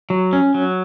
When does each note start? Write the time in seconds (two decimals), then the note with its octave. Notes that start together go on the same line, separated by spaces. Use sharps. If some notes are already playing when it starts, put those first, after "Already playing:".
0.10 F#3
0.33 C#4
0.54 F#3